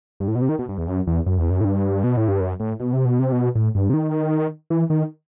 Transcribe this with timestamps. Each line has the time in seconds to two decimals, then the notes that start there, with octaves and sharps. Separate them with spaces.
0.20 G2
0.28 A2
0.35 B2
0.42 C3
0.49 D#3
0.59 B2
0.69 G2
0.78 E2
0.88 F#2
1.07 E2
1.26 F#2
1.38 E2
1.50 F#2
1.61 A2
1.65 G2
2.04 B2
2.17 A2
2.28 G2
2.40 F#2
2.60 A2
2.80 B2
2.93 C3
3.05 B2
3.19 C3
3.32 B2
3.55 A2
3.75 G2
3.90 C3
3.94 D#3
4.70 E3
4.90 D#3